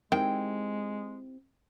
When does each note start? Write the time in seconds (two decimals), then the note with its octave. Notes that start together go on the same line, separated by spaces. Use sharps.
0.12 D#3 G#3 C4 E4 G4 G5